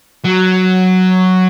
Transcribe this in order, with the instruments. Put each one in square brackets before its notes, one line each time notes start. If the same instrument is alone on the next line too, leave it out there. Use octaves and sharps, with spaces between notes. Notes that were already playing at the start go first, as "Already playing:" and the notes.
[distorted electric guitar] F#3